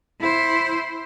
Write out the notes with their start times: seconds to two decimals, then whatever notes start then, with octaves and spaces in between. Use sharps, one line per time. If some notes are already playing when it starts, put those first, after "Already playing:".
0.20 E4 C5